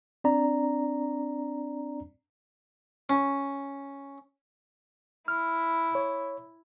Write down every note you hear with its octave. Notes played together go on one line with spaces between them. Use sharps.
C4 D4 D5 A#5
C#4
E4 F6
C#5